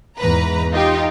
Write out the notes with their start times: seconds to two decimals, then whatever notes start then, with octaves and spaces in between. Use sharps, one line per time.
0.19 E2 G#2 B4 A#5
0.73 D#4 F4 G4